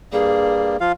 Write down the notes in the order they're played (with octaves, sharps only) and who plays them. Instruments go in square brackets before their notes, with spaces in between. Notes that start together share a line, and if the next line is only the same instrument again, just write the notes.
[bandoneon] G2 G3 A#3 [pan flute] G#4
[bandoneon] F3 F4 F5